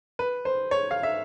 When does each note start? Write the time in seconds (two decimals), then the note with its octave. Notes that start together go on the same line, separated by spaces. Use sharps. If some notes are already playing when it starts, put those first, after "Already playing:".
0.19 B4
0.45 C5
0.71 C#5
0.91 F5
1.03 E5